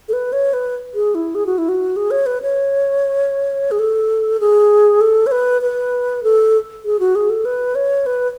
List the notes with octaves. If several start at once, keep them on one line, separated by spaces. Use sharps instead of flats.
A4
B4
C#5
B4
G#4
E4
G#4
F#4
E4
F#4
G#4
C#5
B4
C#5
G#4
A4
G#4
A4
C#5
B4
B4
A4
G#4
F#4
G#4
A4
B4
C#5
B4